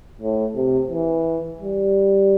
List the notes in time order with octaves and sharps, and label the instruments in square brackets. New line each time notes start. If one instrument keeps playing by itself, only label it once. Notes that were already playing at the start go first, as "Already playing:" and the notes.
[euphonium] A2
C3
E3
G3